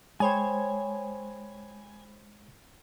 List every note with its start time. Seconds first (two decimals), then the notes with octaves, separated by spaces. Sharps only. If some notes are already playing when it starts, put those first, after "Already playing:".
0.20 G#3 C5 C#5 G5 G#5 B5 D#6 G#6